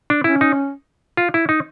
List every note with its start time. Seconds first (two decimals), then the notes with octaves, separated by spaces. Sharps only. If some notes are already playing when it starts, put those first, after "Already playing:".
0.10 D4
0.24 C#4 E4
0.41 D#4
1.17 F4
1.34 E4
1.49 D#4